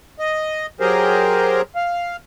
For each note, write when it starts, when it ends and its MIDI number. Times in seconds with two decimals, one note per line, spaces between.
0.19 0.66 75
0.80 1.61 54
0.80 1.61 67
0.80 1.61 68
0.80 1.61 70
0.80 1.61 72
1.75 2.16 77